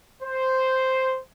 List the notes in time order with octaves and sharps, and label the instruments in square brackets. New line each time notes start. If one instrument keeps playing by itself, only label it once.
[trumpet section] C5